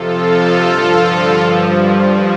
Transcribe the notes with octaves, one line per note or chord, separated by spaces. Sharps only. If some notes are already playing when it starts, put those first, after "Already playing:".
Already playing: F2 C3 F3 F4 A4
G2 D3 F3
G2 F3